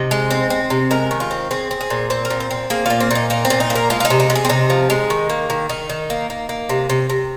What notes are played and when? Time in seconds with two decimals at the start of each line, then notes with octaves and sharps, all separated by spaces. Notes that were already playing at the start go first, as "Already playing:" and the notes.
Already playing: C3 D#4
0.11 G#3
0.31 C4
0.50 C4
0.70 C3
0.91 G#3 A#4
1.11 D#3
1.20 F4
1.31 C4
1.51 C4 G#4
1.71 C4
1.81 G#4
1.90 A#2
2.10 C4 C5
2.25 A#4
2.30 A#2
2.40 C5
2.51 C4
2.70 A#3 G#4
2.86 A#2 F4
3.00 C4
3.11 A#2 D#4
3.30 A#3 D#4
3.45 C4
3.50 A#2
3.60 D#4
3.70 A#3
3.75 A#4
3.90 G#3 F4
4.00 F4
4.05 D#4
4.10 C3
4.20 D#4
4.30 C3
4.35 G#4
4.45 C4
4.49 C3 D#4
4.70 F3
4.90 G#3
5.10 D#3
5.29 A#3
5.50 D#3
5.69 D#3 D#4
5.90 D#3
6.10 A#3
6.30 A#3
6.49 A#3
6.69 C3
6.90 C3
7.10 C3